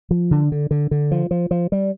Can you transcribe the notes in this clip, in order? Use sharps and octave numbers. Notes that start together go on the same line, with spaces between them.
F3
D3
D3
D3
D3
F3
F3
F3
G3